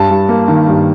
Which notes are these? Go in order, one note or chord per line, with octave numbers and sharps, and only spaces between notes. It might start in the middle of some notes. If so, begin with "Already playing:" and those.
Already playing: G2 A5
G2
A#3
D#3
G2